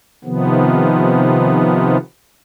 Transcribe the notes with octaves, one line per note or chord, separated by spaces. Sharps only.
C3 D#3 F3 B3